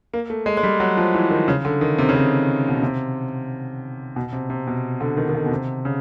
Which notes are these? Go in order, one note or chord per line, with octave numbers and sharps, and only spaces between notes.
A#3
A3
G#3
G#3
G3
F#3
F3
E3
D#3
C#3
D3
D#3
C3
C#3
C3
B2
C3
B2
C3
C3
B2
D3
D#3
D#3
D3
B2
C3
C#3